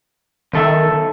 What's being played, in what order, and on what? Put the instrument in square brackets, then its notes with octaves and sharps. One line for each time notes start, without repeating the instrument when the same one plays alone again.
[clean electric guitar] B1 A4 E5 [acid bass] D#3